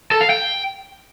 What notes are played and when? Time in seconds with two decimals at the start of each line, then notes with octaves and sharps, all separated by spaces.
0.11 A4
0.21 F5
0.30 G5